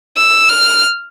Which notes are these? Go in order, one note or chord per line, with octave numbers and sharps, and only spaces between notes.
E6
F6